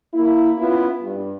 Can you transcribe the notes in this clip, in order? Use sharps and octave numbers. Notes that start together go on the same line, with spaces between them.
A#3 E4
B3 C#4 E4 F4
G2